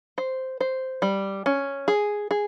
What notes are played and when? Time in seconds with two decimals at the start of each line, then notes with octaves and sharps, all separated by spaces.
0.18 C5
0.61 C5
1.02 G3
1.46 C#4
1.88 G#4
2.31 G#4